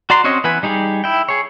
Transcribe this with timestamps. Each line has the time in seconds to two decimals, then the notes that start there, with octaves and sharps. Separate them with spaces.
0.10 F#4 D5 A#5 C6
0.24 C4 C#4 F#4 C#5 D#5
0.44 E3 B3 B4 G#5
0.63 G3 D#4 G4 G#4
1.04 E4 G5
1.29 G#4 C#5